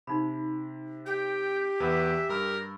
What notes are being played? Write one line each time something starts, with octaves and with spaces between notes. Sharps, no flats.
C3 D#4 B5
G4 G5
E2 B4 E5
G2 A#4 E6